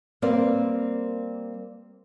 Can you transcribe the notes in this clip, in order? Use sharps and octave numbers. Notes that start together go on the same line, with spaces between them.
G3 A#3 C4 A#4 B4 D5